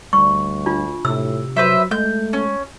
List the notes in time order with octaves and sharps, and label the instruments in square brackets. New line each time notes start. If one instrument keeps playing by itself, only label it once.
[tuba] D2 [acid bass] G3 [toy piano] C#6
[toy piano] D4 F4
[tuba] A2 [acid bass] C3 [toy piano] E6
[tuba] F#3 [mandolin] B4 C5 E5
[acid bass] G#3 [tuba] A3 [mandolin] G6
[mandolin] C#4